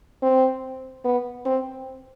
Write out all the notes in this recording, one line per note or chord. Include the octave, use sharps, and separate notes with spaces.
C4
B3
C4